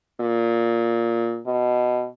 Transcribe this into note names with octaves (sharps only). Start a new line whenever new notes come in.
A#2
B2